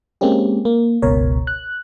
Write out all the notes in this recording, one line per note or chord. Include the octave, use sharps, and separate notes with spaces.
G#3 A#3 C4 C#4 G4
A#3
G1 C#2 B2 A#4 C#5
F#6